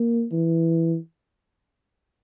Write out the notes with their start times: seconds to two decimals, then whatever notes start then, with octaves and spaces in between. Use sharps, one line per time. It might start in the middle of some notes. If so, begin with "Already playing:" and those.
Already playing: A#3
0.32 E3